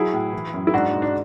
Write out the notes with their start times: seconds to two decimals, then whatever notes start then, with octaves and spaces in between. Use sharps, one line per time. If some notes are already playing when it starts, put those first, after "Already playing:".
Already playing: F#3 E4 G#4
0.13 A2
0.33 E3
0.54 F#2
0.67 E4
0.74 G#2 D4 F#4
0.93 G#2
1.02 D4